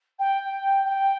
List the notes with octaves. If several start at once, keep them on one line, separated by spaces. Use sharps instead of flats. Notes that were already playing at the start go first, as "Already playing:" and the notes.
G5
G5